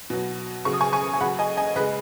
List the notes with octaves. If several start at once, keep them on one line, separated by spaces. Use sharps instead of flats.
B2 F#3
C#3 F#3 C#6
D#6
G#5 C#6
G#5 C#6
G#5
C#3 F#3 F#5 B5
D#5 G#5
D#5 G#5
C#3 G#3 B4 D#5